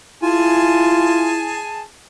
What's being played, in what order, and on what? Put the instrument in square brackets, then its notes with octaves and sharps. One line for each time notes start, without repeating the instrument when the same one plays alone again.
[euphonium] E4 [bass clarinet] F4 [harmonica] G#4 G#5 A5